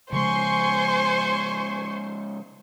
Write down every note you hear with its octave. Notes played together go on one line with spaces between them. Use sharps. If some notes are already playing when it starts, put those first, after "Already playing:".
C#3 F3 G#3 C5 G#5 C6 C#6